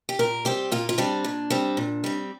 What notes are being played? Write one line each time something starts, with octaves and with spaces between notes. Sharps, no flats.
G4
A#2 A#4
G3 C4 G4
A#2 F4
F4
G3 C4 D4
A#2
G3 C4
A#2
G3 C4